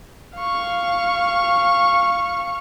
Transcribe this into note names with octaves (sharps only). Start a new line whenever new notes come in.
F5 C#6